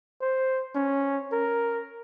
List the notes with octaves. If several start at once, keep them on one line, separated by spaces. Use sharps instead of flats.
C5
C#4
A#4